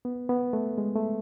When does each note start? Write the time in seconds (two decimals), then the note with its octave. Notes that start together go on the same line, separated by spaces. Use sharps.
0.05 B3
0.29 B3
0.53 A3
0.78 G#3
0.96 A3